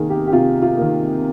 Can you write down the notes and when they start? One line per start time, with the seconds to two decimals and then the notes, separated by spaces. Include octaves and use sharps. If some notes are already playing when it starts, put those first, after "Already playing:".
Already playing: C3 D#3 A#3 G#4 A#4
0.10 G4
0.27 G4
0.32 C3 F4
0.62 F4
0.77 D#3 A#3